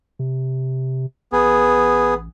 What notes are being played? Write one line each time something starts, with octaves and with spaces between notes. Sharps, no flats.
C3
A1 B3 G#4